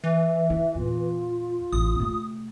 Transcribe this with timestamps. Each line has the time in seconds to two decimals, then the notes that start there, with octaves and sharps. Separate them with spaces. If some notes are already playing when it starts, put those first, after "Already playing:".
0.04 E3 E5
0.50 E4
0.75 E2 A#2 F4
1.72 A1 D#6
2.00 C3 A3